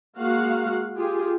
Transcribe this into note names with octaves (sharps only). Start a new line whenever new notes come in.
G#3 A#3 F#4 F5 F#5
F4 G4 G#4